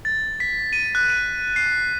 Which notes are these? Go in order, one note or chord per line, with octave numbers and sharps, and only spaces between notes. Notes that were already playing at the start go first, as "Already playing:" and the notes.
A6
B6
D#7
F#6
D#7
C7